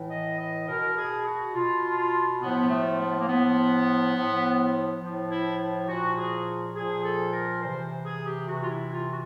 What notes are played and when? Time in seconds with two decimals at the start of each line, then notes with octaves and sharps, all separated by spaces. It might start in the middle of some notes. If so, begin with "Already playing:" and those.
Already playing: A2 E3
0.10 D#5
0.39 D#5
0.68 B2 A#4
0.97 G#4
1.26 F#4
1.54 B2 F4
2.42 A2 F3 B3
2.70 A3
3.00 B3
3.20 A#3
3.28 A2 F3 B3
4.15 A2 F3
5.01 A2 F3
5.30 E4
5.88 A#2 F3 F#4
6.17 G#4
6.75 A#2 F3 G#4
7.04 A4
7.33 A#4
7.62 C3 E3 C5
8.05 G#4
8.27 G4
8.48 C3 E3 F#4
8.63 F4
8.70 E4
8.92 F4
9.10 F#4